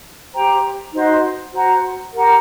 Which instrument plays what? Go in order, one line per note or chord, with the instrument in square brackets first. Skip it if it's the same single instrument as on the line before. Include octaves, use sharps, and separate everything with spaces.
[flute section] G4 C5 G5 A#5
D#4 F#4 C5 D#5
F#4 C5 F#5 A#5
G4 A#4 F#5 A#5